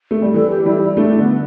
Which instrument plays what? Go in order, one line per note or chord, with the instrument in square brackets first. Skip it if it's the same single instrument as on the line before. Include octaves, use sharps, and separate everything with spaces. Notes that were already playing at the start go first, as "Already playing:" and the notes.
[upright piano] A3
G3
[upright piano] E3 [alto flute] A4
[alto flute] G4
[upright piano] G3 [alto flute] E4
[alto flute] E4
[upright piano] A3 [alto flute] D4
[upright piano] D3 [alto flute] B3